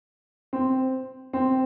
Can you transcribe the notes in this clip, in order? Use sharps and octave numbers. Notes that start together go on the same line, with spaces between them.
C4
C4